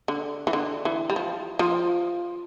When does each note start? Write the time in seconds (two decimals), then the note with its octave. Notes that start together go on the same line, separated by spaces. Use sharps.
0.08 D3
0.47 E3
0.53 D3
0.85 E3
1.10 G3
1.16 F3
1.59 F3